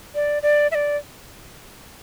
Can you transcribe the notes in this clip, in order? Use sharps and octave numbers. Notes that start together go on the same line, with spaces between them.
D5
D5
E5
D5